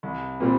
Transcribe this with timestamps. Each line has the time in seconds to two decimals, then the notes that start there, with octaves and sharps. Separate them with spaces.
0.03 C2
0.40 A#2 G3 C4